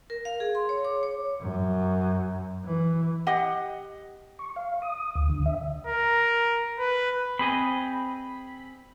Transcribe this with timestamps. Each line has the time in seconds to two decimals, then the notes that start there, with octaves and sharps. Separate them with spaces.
0.10 A#4
0.25 F5
0.40 G#4
0.55 C6
0.69 C#5
0.84 D6
1.03 C#5
1.41 F#2
2.65 E3
3.27 G4 D#5 F#5
4.39 C#6
4.56 F5
4.82 D#6
5.15 D2
5.30 D3
5.46 E5
5.87 A#4
6.79 B4
7.39 C4 G#4 D#5 B5